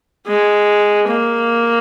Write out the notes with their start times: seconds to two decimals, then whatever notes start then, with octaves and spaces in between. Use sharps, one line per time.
0.27 G#3
1.08 A#3